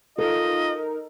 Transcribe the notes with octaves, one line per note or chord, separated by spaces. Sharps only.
D#4 F4 A4 A#4 D#5